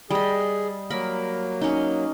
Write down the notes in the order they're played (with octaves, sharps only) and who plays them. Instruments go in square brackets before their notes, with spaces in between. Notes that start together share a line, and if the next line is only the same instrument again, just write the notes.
[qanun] G3 D#5 [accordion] G#4
[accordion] F#3 A#3 [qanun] A#4 B5
[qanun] C#4 D#4